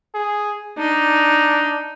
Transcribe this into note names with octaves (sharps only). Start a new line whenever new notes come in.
G#4
D4 D#4